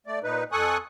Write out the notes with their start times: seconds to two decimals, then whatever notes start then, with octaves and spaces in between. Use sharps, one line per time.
0.07 A3 D5
0.23 A#2 D#4 B4
0.52 F2 A4 G#5 C#6 D#6 F#6